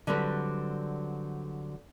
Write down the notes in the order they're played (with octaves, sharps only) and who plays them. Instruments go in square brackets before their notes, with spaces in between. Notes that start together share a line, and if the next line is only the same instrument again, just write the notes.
[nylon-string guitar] D3 F#3 G3 C4 B4